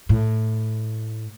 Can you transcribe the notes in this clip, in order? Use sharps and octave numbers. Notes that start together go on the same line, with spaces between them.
A2